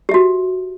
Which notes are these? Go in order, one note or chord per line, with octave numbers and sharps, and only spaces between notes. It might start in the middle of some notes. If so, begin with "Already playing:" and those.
F#4 G4 E5